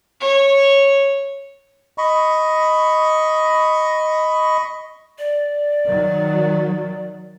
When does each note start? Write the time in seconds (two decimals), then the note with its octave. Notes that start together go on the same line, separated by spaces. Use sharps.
0.20 C#5
1.98 D#5 B5 C#6
5.19 D5
5.86 D#3 F#3